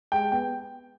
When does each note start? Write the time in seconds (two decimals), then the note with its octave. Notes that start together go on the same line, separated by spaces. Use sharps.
0.12 G#3 G5
0.31 B3 G5